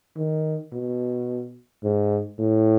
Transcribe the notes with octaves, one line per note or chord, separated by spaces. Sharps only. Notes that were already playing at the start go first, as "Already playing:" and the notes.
D#3
B2
G#2
A2